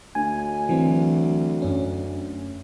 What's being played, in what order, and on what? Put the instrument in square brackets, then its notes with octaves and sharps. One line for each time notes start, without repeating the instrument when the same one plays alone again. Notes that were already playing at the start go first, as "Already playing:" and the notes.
[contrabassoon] D2 [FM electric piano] G#5
[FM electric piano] E3 F#3 C4
F#2 C#4